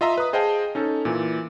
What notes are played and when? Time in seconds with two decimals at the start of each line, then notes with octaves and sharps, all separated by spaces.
0.01 F4 D#5 E5 A#5 C6
0.18 B4 D#6
0.33 G#4 C5 D#5 F5 G5 A5
0.75 C#4 D#4 A4
1.05 A#2 E3